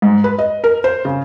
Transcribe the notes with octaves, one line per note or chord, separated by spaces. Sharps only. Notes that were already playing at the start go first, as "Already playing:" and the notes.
G#2
B4
D#5
A#4
C5
C#3